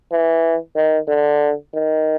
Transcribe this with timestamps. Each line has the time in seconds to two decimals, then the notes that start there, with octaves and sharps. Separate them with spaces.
0.11 E3
0.75 D#3
1.08 D3
1.73 D#3